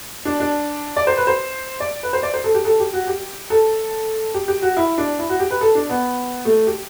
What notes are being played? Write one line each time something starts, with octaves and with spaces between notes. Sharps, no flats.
D4
D4
D5
C5
B4
C5
D5
B4
C5
D5
C5
A4
G4
A4
G4
F#4
G4
A4
G4
G4
F#4
E4
D4
E4
F#4
G4
B4
A4
D4
B3
A3
G4